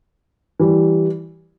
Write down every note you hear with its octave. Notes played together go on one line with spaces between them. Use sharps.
E3 G3